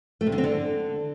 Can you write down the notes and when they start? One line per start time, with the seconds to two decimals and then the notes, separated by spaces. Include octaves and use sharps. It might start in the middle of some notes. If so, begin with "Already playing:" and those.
0.21 A3
0.27 C3
0.32 D3
0.38 C4
0.44 D3